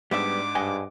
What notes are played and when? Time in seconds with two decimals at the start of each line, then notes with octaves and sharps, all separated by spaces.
0.11 G#2 G3 B3 D4 E5 D6
0.55 G2 D#5 F#5 G#5